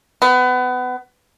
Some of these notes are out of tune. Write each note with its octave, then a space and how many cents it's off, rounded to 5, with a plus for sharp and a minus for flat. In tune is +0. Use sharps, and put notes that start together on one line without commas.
B3 +25